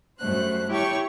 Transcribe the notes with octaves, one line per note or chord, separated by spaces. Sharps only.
F#2 G3 A3 C5 F#6
E4 G4 C#5 G5 A5 C#6